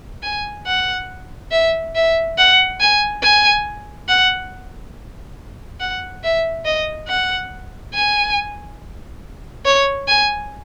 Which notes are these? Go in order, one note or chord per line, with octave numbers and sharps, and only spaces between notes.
G#5
F#5
E5
E5
F#5
G#5
G#5
F#5
F#5
E5
D#5
F#5
G#5
C#5
G#5